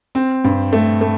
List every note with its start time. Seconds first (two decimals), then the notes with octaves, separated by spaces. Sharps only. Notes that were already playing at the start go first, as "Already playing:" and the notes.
0.15 C4
0.44 G2
0.73 A3
1.01 A3